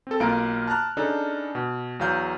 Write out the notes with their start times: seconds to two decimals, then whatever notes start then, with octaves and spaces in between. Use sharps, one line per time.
0.07 C4 A4
0.20 B1 A#3 F4 F5 A#5 D7
0.67 A5 A#5 F6 F#6
0.97 C#3 D4 D#4 A4
1.55 B2
2.00 E2 F#3 F5 G6